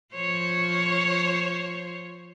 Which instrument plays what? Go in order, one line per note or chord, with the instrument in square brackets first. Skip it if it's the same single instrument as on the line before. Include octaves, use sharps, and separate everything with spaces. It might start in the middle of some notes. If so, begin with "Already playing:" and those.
[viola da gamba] F3 C5 C#5